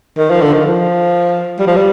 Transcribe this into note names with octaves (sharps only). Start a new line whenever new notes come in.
D#3
F3
D3
D#3
F3
G3
F3
G3